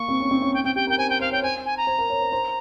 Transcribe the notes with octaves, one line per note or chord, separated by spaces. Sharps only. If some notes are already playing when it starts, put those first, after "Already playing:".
Already playing: A#3 C#6
C4
C#4
C4
C#4
G5
C4 G5
G4 G5
A#4 G5
C5 G#5
C5 G5
C5 F5
C#5 G5
C5 G#5
G#5
A#5
C5
A#4
C#5
C5
C5